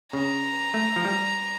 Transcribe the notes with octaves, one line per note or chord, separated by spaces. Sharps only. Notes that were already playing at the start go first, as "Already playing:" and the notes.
C#3 A#5
A3
F3
G3